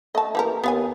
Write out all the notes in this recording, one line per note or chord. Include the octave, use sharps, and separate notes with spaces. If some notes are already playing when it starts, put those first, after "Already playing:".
A3 D#5 A5
E3 A#3 G4 A#4
D#2 B3 F5 G#5